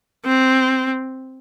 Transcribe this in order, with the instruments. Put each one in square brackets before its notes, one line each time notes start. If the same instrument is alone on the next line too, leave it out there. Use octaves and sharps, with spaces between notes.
[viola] C4